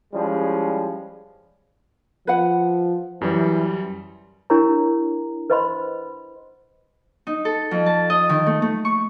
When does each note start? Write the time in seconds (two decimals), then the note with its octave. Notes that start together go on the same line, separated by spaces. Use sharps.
0.13 F3 G3 G#3 C#4 E4
2.27 F3 B4 F#5
3.21 F#2 E3 G3
4.50 D4 E4 G4 A#4 C#5 A#5
5.50 B4 C5 D#5 F#5 B5 C6
7.27 D#4
7.45 A4
7.71 F2
7.86 A5
8.10 D#5
8.29 D#3
8.47 A3
8.62 A3
8.85 C#6